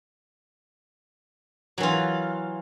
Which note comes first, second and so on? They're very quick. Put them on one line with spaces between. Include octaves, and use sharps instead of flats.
F#3 E3 F4